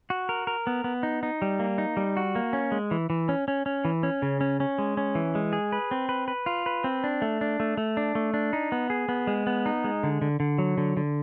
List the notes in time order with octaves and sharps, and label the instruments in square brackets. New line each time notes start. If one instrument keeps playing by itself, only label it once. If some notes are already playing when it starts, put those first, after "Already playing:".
[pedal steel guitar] F#4
A#4
A#4
B3
B3
D#4
D#4
G3
A#3
D#4
G3
F#4
A#3
C#4
G#3
E3
E3
C#4
C#4
C#4
E3
C#4
C#3
C#4
C#4
G#3
C#4
E3
G#3
G#4
B4
C4
B4
B4
F4
B4
C4
D4
A3
D4
A3
A3
D4
A3
D4
D#4
B3
G#4
B3
G#3
B3
D#4
G#3
D3
D3
D3
F#3
D3
D3